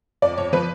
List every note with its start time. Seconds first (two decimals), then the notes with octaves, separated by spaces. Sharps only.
0.22 F2 D5
0.38 F2 C#5
0.53 F3 B4